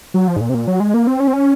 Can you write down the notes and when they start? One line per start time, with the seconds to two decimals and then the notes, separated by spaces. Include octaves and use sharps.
0.14 F#3
0.28 F3
0.36 G#2
0.41 A#2
0.49 C3
0.54 A#2
0.67 F#3
0.80 G#3
0.94 A#3
1.07 C4
1.20 C#4
1.27 C4
1.33 C#4